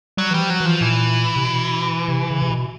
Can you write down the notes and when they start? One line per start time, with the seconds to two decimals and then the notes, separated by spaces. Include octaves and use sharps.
0.17 F#3 G3
0.31 E3
0.34 G3
0.39 F3
0.50 F#3
0.60 E3
0.66 F3
0.81 A#2 E3
1.36 C3
1.45 B2
2.08 C3
2.30 C#3
2.42 C3
2.51 B2